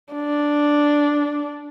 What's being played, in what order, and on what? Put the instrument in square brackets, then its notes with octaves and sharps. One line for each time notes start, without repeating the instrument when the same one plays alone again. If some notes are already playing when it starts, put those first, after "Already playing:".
[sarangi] D4